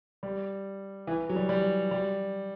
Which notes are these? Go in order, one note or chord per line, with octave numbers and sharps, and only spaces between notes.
G3
E3
F#3
G3
G3
G3